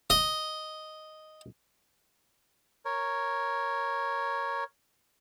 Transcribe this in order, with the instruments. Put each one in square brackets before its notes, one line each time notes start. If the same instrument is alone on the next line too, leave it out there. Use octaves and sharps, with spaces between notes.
[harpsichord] D#5
[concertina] A#4 C#5